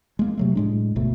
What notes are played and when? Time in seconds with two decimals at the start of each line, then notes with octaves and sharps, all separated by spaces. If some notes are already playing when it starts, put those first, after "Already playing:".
0.19 G#3 A#3
0.37 C3 F#3 A3
0.55 A2 G#3 D4
0.96 G1 D2 B2 A3